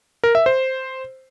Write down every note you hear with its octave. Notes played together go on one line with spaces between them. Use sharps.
A#4
E5
C5